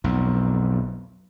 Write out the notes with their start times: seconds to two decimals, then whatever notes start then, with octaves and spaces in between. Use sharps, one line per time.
0.04 B1 F2